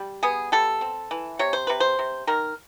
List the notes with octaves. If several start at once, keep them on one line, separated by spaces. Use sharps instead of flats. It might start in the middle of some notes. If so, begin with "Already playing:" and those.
Already playing: G3
B3 G#4
G3 A4
C4
E3
C3 C#5
C5
C3 B4
C5
C3
D#3 A#4